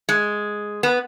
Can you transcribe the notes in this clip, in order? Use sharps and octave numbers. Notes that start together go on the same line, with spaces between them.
G#3
B3